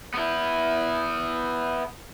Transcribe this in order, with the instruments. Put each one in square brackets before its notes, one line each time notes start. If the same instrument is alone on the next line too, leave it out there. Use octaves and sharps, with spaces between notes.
[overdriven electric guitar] B3 E4